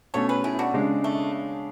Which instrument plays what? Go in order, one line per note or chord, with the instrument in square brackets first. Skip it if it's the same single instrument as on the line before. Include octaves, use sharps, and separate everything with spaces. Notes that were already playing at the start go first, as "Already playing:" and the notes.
[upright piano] B2 A3 C#4 [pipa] A4 C#5
[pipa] G#4 B4
E4 G#4
D4 F#4
[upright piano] C#3 G#3 D4
[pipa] A3